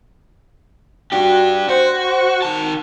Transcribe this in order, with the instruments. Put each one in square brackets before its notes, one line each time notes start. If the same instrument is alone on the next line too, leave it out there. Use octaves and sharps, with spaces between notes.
[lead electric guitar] D4 G4 [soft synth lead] F#4
[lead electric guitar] F#4 [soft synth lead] C5
[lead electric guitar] D#3 A5